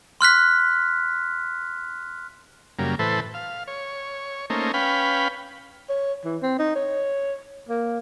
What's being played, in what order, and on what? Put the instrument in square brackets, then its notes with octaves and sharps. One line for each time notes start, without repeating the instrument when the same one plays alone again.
[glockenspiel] C6 F6 F#6 B6
[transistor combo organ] F#2 C#3 G3 A#3
A2 E3 A4 B4 C5
F5
C#5
A3 A#3 C#4 D#4 C5
C#4 B4 F5 G5 B5
[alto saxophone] C#5
E3
C4
D#4
C#5
A#3